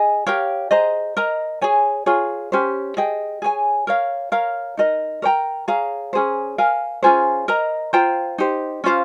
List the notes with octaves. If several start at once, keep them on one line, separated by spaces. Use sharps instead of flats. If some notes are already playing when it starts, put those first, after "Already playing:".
Already playing: G#4 D#5 G#5
G4 A#4 C#5 F5
G#4 C5 D#5 A#5
A#4 D#5 A#5
G#4 C#5 G#5
F4 G#4 C#5
C#4 G4 C5
G#4 D#5 G5
G#4 C#5 G#5
A#4 C#5 F5
A#4 C#5 F5 A#5
D#4 A#4 D#5
A#4 C#5 G5 A#5
G#4 C#5 F5 A#5
C#4 G#4 C5
A#4 F5 G#5
C#4 F4 G#4 C5
A#4 D#5 A#5
F4 C5 G5 A#5
D#4 G4 C5
C#4 F4 C5 F5